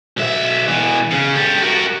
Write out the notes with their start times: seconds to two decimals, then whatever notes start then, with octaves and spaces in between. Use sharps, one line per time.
0.17 B1 E5
0.68 B2 E3
1.11 C#3
1.36 G4 A4
1.62 F#4 A#4